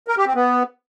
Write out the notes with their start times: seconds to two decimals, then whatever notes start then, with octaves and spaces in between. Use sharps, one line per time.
0.08 A#4
0.17 G4
0.26 C4
0.35 B3